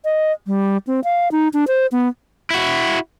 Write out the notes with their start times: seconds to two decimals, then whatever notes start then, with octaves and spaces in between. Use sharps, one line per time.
0.05 D#5
0.47 G3
0.87 C4
1.04 F5
1.32 D#4
1.53 D4
1.68 C5
1.92 B3
2.50 E4 F#4